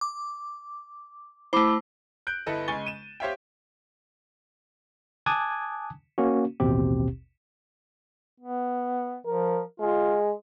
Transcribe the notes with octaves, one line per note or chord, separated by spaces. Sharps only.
D6
A3 E4 C5 B5 D6
F#6 G6 D7
G1 E4 A4 B4 D#5
C#3 G#3 G#5 C#6 A6 G7
D#7 E7
G4 C5 C#5 E5 F5 G5
G#5 A5 D6 D#6 F#6 G#6
A#3 C#4 F#4
A1 D#2 B2 C4 G4
B3
F3 A#4
G#3 F4